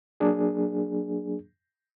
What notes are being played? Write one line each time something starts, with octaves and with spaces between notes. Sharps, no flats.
F#3 A#3 D4 G#4